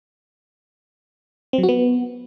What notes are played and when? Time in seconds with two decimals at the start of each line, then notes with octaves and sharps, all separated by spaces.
1.53 C4
1.58 F#3
1.63 F#4
1.69 B3